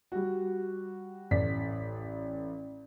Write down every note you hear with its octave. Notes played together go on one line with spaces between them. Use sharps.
G3 F#4
A1 D5 B6